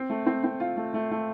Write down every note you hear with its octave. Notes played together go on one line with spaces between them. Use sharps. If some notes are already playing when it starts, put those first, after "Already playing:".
Already playing: C4
A3
C4
C4
F4
A3
A3
A3